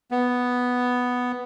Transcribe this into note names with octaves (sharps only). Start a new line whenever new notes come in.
B3